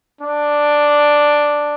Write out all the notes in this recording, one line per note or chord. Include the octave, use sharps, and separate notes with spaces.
D4